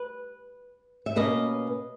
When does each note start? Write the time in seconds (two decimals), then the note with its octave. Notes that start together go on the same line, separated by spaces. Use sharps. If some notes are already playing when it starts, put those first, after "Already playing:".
Already playing: B4
1.06 E5
1.16 B2 A#3 C#4 B4 D#5